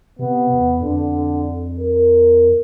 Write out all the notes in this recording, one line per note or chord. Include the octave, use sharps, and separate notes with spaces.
C3 B3
E2
F2 D3
A#4